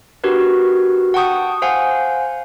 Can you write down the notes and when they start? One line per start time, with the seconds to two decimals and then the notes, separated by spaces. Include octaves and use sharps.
0.24 D4 F#4 G4 A#4 B4
1.14 F#5 G5 A5 C#6 D#6 G6
1.62 C5 F5 F#5 G#5